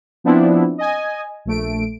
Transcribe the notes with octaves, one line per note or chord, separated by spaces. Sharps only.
F3 B3 C4 D4 E4
D#5 G#5
A#1 A3 D7